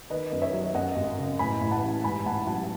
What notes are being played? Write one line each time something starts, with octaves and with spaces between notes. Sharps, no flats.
D#3 B4 D#5
F#2
C#5 E5
F#3
F#2 D#5 F#5
G#1
C#3
A2 G#5 B5
A1
F#5 A5
E3
G#2 G#5 B5
A1 F#5 A5
F#3 F#5 A5